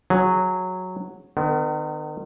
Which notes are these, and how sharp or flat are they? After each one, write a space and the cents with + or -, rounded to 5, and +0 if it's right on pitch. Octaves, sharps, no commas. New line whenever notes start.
F#3 -5 G#4 +0
D#3 -40 B3 +35